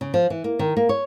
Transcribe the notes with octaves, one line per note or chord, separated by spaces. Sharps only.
C#3
F3
E3
A#3
D#3
A#3
C#5